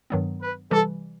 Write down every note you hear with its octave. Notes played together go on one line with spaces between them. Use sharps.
G2 D#3 F#3 B3
B4
C3 E3 G3 A4